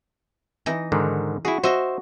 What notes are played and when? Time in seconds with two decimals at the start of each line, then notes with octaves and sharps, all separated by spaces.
0.66 E3 D#4
0.92 G#2 D3 D#3
1.45 E4 F#4 G#4
1.64 F#4 C5 D#5 E5